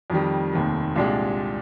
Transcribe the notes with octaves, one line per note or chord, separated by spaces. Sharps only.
F2 D#3 G3
F1 D#2 D#3
C2 A#2 G#3 D4 G4